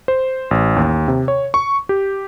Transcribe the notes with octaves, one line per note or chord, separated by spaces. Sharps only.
C5
A1
D#2
C3
C#5
C#6
G4